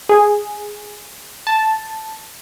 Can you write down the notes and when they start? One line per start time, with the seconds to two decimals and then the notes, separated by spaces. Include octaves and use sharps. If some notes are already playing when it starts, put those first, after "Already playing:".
0.09 G#4
1.47 A5